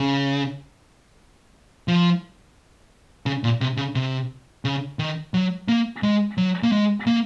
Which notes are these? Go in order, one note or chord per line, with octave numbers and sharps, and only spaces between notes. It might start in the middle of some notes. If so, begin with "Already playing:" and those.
Already playing: C#3
F3
C#3
A#2
C3
C#3
C3
C#3
D#3
F#3
A#3
G#3
F#3
A#3
G#3
A#3